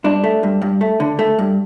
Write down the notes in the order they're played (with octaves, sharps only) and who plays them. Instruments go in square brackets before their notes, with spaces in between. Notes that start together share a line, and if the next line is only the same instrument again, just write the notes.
[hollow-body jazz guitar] G2 D4
A3
G2
G2
A3
D3
A3
G2